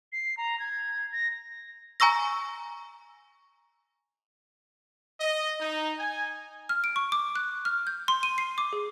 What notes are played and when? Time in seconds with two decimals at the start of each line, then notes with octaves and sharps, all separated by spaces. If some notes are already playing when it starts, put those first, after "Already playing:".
0.12 C7
0.37 A#5
0.60 G#6
1.12 A#6
2.00 G#5 A#5 C#6 E6 A#6
5.21 D#5
5.61 D#4
5.99 G#5
6.69 F6
6.84 D7
6.96 C#6
7.12 D6
7.36 F#6
7.65 F6
7.87 G6
8.08 C6
8.23 D#7
8.38 C7
8.58 D6
8.73 G#4